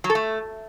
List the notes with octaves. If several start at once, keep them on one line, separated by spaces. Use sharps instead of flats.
F#3
A4
A3